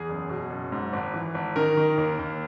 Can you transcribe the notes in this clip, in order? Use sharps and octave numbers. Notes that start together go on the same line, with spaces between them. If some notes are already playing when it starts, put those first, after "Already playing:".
Already playing: E2 G#4
F#1
B2
F#1
G#2
G#1
E3
G#1
D#3 A#4
D#3
D#2
D#2